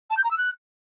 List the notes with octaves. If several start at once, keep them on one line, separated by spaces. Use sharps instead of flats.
A5
G6
A#5
E6
F#6